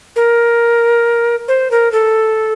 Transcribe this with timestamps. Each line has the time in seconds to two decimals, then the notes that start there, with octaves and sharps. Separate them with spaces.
0.16 A#4
1.48 C5
1.71 A#4
1.92 A4